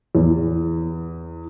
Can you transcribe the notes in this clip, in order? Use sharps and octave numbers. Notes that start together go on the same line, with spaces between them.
E2